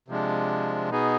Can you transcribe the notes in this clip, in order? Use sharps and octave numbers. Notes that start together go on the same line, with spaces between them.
C3 F3 G#3 D4
B2 B3 D#4 G#4